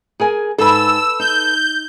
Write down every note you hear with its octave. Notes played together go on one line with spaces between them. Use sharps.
G#4 A#4 G#5
G#2 A4 B4 E6
D#4 G6